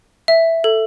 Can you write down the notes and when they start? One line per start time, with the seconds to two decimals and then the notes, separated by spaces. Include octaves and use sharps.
0.28 E5
0.64 A4